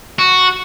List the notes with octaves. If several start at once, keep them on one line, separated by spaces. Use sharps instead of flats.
F#4